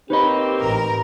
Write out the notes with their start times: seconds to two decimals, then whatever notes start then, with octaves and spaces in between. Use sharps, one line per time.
0.10 A#3 C4 D#4 G4 B4 C#5 D#5 B5
0.62 A1 A#4